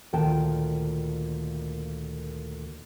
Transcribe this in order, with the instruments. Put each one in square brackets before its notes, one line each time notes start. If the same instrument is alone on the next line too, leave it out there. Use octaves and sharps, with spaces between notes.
[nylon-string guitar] D2 A#2 D#3 G5 A5